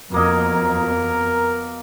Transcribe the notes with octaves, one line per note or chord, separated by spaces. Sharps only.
F2 B2 A#3 A#4 D#5